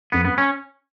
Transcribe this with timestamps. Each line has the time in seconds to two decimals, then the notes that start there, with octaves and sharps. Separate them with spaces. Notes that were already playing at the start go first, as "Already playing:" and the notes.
0.12 F2 B3
0.25 F#2 B3
0.38 C#4